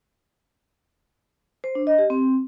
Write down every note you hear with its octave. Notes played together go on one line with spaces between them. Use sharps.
C5
D4
D#5
G4
C4